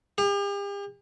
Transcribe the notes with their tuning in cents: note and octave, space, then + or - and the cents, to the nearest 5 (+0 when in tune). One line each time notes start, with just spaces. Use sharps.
G4 +45